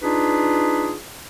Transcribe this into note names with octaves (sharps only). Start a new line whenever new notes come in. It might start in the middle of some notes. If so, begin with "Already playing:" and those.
D4 D#4 F4 G#4 B4